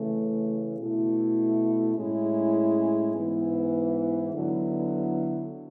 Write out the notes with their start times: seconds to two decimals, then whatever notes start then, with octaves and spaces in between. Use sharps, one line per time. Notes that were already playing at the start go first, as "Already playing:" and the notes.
Already playing: C#3 E3 A3
0.79 B2 A3 E4
1.97 A2 G#3 C#4 E4
3.14 G#2 E3 B3 E4
4.33 D3 F#3 B3 E4